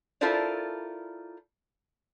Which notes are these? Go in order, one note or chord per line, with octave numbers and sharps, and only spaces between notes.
E4 F4 A4 A#4 C5 D5